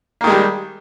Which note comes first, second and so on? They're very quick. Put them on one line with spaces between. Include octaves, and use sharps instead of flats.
A#3 D#3 G#3 G3